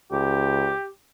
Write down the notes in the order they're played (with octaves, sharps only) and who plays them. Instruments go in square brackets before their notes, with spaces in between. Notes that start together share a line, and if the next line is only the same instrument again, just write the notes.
[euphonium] C#2 [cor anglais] G4